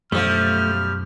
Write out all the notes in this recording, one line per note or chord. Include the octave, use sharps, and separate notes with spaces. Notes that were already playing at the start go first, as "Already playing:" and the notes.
B1 F#2 F3 G3 A3 F6